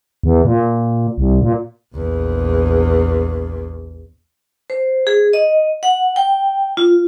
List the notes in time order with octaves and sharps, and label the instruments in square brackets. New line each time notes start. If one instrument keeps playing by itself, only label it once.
[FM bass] E2
A#2
C2
A#2
[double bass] A#1 E2
[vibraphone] C5
G#4
D#5
F#5
G5
F4